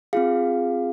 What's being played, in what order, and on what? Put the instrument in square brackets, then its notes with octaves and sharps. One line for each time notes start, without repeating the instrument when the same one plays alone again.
[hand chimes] C4 F4 G#4 F5